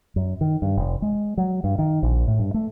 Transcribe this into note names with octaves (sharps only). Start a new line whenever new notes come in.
F#2
D#3
G2
F1
G#3
F#3
G2
D#3
A#1
A2
G2
A3